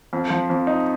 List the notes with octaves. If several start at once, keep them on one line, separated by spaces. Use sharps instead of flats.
F2
F3
F2
D#4